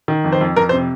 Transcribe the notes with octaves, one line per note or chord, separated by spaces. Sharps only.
D#3
F2
C5
F2
F2 A#4
C5
C3